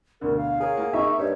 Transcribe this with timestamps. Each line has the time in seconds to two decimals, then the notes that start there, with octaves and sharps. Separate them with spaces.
0.21 D2 B2 D3 A#4
0.37 F5
0.60 G#4 A#4 C#5
0.76 A#3 F4 F#5
0.93 D#4 E5 C#6
1.19 G2 C#5